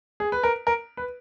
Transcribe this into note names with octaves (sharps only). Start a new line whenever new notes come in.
G#4
B4
A#4
A#4
B4